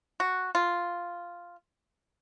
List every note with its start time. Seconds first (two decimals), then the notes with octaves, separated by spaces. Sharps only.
0.20 F#4
0.55 F4